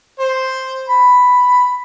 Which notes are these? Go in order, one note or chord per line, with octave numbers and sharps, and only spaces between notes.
C5
B5